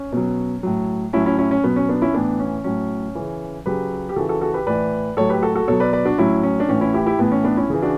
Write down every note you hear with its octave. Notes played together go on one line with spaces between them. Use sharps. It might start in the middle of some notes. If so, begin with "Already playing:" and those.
Already playing: C#4
B2 F#3
A2 F#3
A2 F#3 C#4 E4
C#4 E4
C#4 E4
C#4
B2 F#3 B3
C#4
B3 D4
C#4 E4
A2 E3 B3 D4
C#4
A2 F#3 C#4
C#3 E3
C#3 F#3 G4 B4
G4
C#3 E3 F#4 A4
F#4 A4
F#4 A4
G4 B4
A2 E3 B4 D5
A2 F#3 A4 C#5
G4 B4
F#4 A4
F#4 A4
B2 F#3 A4 C#5
B4 D5
B4 D5
D4 F#4
A2 F#3 C#4 E4
C#4
D4
A2 E3 C#4
C#4 E4
E4 G4
E4 G4
A2 E3 B3
C#4
B3 D4
C#4 E4
C#3 E3
D4 F#4